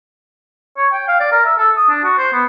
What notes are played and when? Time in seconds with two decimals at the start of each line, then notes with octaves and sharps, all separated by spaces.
0.78 C#5
0.92 G5
1.08 F5
1.20 D5
1.32 A#4
1.45 E5
1.58 A4
1.77 D#6
1.89 D4
2.04 F#4
2.18 C5
2.33 B3